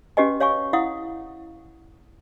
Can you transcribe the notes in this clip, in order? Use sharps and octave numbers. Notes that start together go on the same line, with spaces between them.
C#4 F#4 G4 B4 D#5 G#5
C#5 F5 G#5 C#6
E4 F5 F#5 D#6